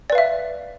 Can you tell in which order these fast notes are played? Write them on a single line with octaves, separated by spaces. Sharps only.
D5 B4 F5 E5